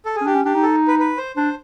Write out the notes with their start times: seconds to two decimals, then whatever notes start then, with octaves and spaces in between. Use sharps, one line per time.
0.05 A4
0.16 G#4
0.21 C#4
0.26 D4 G4
0.35 C#4
0.45 D4 G4
0.54 D#4
0.63 A4
0.88 B4
0.99 B4
1.17 C5
1.36 D4 C5